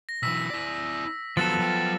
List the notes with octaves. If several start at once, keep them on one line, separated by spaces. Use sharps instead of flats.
A#6
B1 E3 E6 B6
E4 D5
D#2 F3 F#3 B3 A4 E6 F#6 A6
F#3 G5